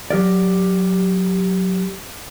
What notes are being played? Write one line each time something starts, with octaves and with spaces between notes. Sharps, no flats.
F#3 G4 A#4 D5